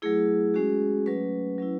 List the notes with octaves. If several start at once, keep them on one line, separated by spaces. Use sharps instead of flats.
F#3 A3 E4 G#4
G#3 C#4 F#4
F#3 A3 C#4 B4
F#3 C#4 E4